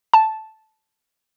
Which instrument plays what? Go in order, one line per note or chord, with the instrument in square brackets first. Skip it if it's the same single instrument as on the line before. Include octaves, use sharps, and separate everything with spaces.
[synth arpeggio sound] A5